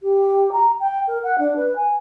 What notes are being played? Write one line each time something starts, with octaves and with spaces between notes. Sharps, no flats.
G4
A#5
G5
A#4
F#5
D4
B4
G#5